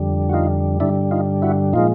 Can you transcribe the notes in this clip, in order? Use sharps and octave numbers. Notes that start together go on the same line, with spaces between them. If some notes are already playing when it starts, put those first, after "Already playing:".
Already playing: F2 D3 G3
F#4
D#4 F4
G2 D3 G3 D4 E4
D#4 F4
E4 F#4
A#2 F3 G#3 D#4 F4